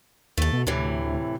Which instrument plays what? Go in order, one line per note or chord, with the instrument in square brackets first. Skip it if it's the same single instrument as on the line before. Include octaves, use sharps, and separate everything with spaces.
[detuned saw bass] D#2 [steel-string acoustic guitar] A3 A4
[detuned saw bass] B2
[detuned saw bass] D2 [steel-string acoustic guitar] A2 C3 E3